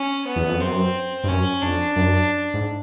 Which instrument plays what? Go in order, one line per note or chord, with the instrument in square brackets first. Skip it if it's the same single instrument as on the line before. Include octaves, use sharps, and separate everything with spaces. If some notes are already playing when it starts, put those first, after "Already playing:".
Already playing: [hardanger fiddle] C#4
B3
[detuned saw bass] E2
F2
[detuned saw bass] F#2 [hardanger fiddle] C4
[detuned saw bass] G2
[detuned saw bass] F#2 [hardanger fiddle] C#4
[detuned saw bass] F2 [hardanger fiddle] D4
[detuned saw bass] F#2
G#2